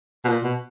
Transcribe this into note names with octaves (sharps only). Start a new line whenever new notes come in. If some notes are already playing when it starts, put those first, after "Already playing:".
B2
A#2
B2